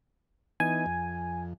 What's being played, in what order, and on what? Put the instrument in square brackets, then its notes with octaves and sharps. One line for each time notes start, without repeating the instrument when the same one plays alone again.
[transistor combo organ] E3 B3 D#4 [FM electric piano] G#5
[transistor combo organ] F2